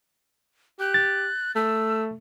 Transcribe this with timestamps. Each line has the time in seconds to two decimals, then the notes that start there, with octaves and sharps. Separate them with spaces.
0.80 G4 F#6
0.94 A6
1.55 A3 E6